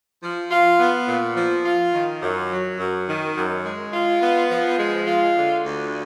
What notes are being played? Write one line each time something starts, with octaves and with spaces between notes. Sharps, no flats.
F3
F4
B3
A#2
F3
F4
D#3
F#2
F#3
F#2
D#3
F#2
G#3
F4
B3
F3
G#3
F4
D3
D2